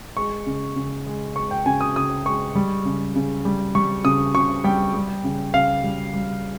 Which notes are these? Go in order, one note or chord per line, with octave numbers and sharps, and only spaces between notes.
G#3 C#6
C#3
C#3
G#3
G#3 C#6
G5
C#3 G#5
D#6
C#3 D#6
G#3 C#6
G3
C#3
C#3
G3
G3 C#6
C#3 D#6
C#3 C#6
G3 G5
G3
C#3
C#3 F5
G3
G3